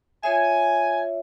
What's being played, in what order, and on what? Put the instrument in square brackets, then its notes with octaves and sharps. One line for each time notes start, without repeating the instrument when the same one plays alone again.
[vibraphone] F4 C#5 E5 [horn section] G#5